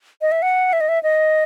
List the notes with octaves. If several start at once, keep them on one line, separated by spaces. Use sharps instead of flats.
D#5
E5
F#5
E5
D#5
E5
D#5